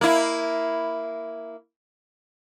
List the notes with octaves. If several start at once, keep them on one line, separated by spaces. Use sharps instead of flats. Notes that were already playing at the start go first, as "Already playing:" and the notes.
A#3 E4